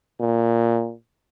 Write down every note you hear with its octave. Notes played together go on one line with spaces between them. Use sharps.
A#2